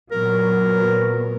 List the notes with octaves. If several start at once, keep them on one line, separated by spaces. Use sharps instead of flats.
A#2 F#3 B3 A#4